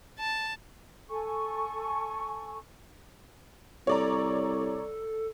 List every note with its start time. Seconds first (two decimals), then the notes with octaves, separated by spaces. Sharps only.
0.19 A5
1.09 A4 G#5 C#6
3.87 C2 A4 C#5 D5 A#5